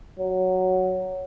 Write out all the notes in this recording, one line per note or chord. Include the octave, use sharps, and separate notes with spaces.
F#3